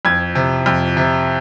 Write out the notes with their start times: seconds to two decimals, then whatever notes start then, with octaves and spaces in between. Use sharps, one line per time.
0.05 F2 G#6
0.35 C3
0.66 F2
0.97 C3